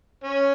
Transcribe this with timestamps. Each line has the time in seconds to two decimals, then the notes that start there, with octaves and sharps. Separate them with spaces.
0.24 C#4